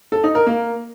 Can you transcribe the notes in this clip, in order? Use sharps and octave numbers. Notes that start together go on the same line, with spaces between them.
A4
D#4
A#4
A#3